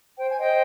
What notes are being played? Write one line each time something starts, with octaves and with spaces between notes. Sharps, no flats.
C5 G5
G#5
C5 D#5 G5